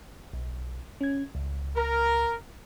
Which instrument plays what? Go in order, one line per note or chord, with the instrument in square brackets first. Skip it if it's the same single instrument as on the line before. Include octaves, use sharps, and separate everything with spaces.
[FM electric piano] B1
C#4 G#6
C#2
[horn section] A#4